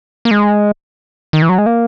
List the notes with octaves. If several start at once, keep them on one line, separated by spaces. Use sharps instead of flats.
A#3
G#3
D#3
E3
F#3
G#3
A#3